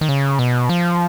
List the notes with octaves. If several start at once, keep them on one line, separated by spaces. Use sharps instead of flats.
D#3
C#3
B2
F3